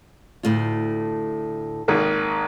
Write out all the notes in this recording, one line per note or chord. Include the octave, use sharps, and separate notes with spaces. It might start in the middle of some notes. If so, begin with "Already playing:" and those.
D2 A2 F4
G#1 D#3 A#3